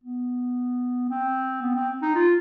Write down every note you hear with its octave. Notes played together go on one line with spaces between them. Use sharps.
B3
C4
B3
C4
D#4
F4